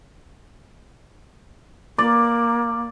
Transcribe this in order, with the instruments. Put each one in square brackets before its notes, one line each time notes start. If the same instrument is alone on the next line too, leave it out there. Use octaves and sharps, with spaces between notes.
[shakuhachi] A#3 [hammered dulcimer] D5